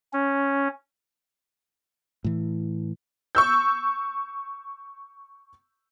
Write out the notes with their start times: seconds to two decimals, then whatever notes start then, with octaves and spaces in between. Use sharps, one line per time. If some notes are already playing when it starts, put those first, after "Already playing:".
0.13 C#4
2.24 A2 E3
3.35 C#6 E6 G6